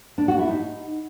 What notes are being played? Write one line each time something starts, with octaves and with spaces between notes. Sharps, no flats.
D4
F#4
E4
D#4